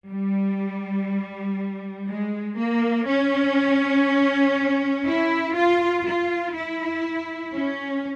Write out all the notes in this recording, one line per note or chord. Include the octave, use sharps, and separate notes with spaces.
G3
G#3
A#3
C#4
E4
F4
F4
E4
C#4